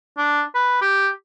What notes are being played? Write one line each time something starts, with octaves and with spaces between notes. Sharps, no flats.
D4
B4
G4